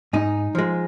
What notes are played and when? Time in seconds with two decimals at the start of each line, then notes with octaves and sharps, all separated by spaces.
0.13 G#2 D#4
0.55 F3 G#3